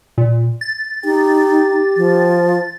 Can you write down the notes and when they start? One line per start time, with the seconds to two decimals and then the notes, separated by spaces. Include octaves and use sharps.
0.18 A#2
0.61 A6
1.05 D#4 G4
1.97 F3